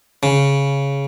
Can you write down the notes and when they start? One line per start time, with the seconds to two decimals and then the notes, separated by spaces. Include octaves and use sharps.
0.23 C#3